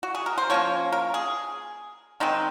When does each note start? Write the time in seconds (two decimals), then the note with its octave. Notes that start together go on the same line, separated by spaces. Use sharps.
0.03 F#4
0.15 G#4
0.26 A#4
0.38 C5
0.50 F3 A#3 C#4 C#5
0.92 A#4
1.14 G#4
2.20 D#3 G#3 C4 D#4